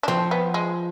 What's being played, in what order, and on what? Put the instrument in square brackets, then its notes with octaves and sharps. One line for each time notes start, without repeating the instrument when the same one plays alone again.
[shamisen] D4
[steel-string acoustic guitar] F3 [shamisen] C4
[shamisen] B3
G#3